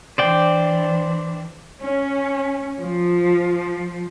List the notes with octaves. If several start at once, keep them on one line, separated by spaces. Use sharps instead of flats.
E3 D4 C5 D5 G5
C#4
F3